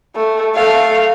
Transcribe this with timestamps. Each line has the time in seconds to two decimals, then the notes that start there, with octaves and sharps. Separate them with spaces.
0.16 A3
0.55 A3 F5